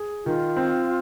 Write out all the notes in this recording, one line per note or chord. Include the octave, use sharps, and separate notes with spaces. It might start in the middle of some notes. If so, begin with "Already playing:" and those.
Already playing: G#4
D#3 F4
C4